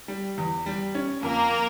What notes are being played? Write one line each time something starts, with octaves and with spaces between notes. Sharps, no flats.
G3
E2
G3
C#4
F2 A#3 A#4